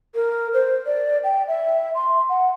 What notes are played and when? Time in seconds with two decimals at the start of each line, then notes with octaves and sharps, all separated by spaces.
0.15 A#4
0.53 C5
0.86 D5
1.24 G5
1.48 E5
1.95 C6
2.29 F#5